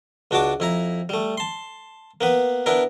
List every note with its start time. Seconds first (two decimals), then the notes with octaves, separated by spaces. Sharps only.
0.31 C#2 D4 F#4 D5 A5 D6
0.60 F2 E4 A#5
1.09 G3 A3
1.37 A5 C6
2.21 A#3 B3 B4
2.66 B3 D4 E4 A#4